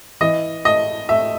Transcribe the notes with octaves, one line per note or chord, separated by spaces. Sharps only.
E3 D#5
A3 D#5
A3 E5